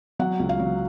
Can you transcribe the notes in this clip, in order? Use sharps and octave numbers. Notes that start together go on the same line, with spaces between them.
F#3 F#5
C#2
F5
F#3